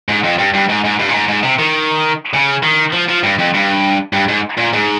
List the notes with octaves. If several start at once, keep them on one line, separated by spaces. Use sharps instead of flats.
G#2
F2
G2
G2
G#2
G#2
G2
A#2
G#2
G#2
C3
D#3
C#3
D#3
F3
F3
G2
F2
G2
G2
G#2
A#2
G#2